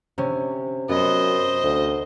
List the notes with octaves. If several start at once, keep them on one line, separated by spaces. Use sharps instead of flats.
C3 C#4
F#2 B3 C5 D#5
D2